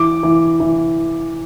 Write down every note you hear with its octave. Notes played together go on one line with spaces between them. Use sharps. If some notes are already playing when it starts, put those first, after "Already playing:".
Already playing: E3 D6
E3
E3